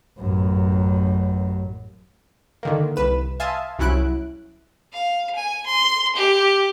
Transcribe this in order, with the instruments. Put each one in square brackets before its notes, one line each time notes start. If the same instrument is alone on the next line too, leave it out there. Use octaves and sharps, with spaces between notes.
[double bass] A1 F#2
[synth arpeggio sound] D3 D#3 A#3
C2 B4 E7
E5 F5 G#5 A5 C6 D#6
C2 F#3 C#4 E4 F#6 D7
[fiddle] F5
G#5
C6
G4